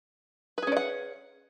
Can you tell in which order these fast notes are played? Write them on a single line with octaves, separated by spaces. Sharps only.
B4 G#4 C#4 D5 F#5